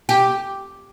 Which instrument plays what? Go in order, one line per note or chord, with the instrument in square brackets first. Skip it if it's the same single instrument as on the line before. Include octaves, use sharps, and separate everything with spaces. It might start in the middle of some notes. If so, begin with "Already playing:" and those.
[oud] G4